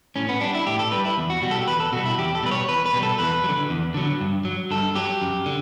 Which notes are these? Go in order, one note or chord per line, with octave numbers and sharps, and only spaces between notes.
A2 C#4
B3
G3 D4
E4
A2 G4
A4
G3 B4
E4
E2
F#4
B2 G3 F#4
A4
G4
E2 B4
A4
B2 G3 F#4
E4
E2 G4
A4
B2 G3 B4
C#5
E2 B4
B4
B2 G3
A4
E2 B4
F#3
D3
E2
D3 F#3
G2
F#3
G2 A4
F#3 G4
F#2
D3